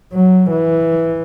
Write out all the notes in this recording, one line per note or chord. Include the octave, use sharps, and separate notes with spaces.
F#3
E3